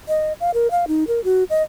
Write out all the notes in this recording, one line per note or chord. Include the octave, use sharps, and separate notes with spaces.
D#5
F5
A#4
F5
D#4
A#4
F#4
D#5